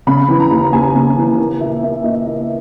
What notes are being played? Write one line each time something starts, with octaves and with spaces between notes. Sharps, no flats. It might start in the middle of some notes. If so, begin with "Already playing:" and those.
C#3 B5
E3
A#5
D#2
D#2 G#5
C#3
E3
A#3
A#2 E5
A#3 E5
A#2 D#5
A#3 E5